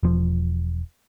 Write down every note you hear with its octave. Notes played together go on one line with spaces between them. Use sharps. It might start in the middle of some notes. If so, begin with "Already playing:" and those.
E1 F3